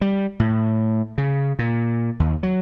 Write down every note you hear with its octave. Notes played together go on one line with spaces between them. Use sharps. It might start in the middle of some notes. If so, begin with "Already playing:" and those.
G3
A2
C#3
A#2
D#2
F#3